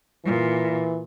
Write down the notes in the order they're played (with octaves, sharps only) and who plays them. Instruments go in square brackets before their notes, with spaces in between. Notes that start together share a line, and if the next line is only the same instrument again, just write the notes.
[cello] A#2 [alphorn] E3